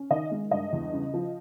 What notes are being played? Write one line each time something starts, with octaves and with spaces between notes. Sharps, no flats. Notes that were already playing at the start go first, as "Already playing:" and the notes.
Already playing: C#4
D#3 D#5
G#3
G2 D#5
E2
C#3
F3